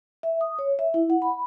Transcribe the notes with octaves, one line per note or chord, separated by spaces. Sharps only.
E5
D#6
C#5
E5
E4
F#5
B5